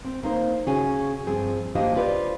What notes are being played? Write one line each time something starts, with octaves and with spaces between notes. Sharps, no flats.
C4
A#3 D#4 C5
C#3 C#4 F#4 G#4 C#5 G#5
G2 F3 C4 G#4
A#3 D4 F4 G4 C5 D#5
F4 G4 B4 C5 D5